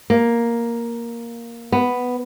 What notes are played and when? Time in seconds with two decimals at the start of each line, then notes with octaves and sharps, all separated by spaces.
0.10 A#3
1.72 B3